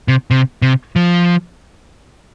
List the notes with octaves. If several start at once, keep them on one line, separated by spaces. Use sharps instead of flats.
C3
C3
C3
F3